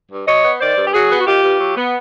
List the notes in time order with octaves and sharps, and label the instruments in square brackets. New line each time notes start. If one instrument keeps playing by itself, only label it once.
[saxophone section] G2
F#3 C#5 D#5
B3
D#3 C5 D5
G2
G4
F#3 F#4 G#4
B3
F#4
D#3 F4 G4
G2
F#3
B3